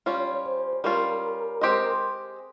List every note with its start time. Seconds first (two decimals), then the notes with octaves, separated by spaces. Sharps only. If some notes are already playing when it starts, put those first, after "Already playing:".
0.06 G3 C#4 F4 C#5
0.46 C5
0.84 G3 C#4 F4 A#4
1.61 G#3 C4 G4 C5 D#5